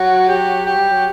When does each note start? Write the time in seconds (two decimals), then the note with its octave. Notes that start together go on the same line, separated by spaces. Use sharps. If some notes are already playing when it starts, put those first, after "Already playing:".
Already playing: F#3 F#4
0.28 G4
0.66 G4
0.77 G3
0.91 F#3